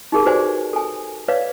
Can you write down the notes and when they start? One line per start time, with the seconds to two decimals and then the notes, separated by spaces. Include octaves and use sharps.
0.12 D#4 G4 G#4 A#4
0.26 F#4 B4 C5 D5 G#5
0.73 A4 G#5
1.28 B4 C#5 D5 F5